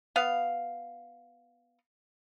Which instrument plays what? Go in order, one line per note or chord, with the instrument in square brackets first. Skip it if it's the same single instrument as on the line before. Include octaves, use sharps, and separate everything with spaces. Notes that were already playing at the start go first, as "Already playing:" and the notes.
[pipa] B3 F5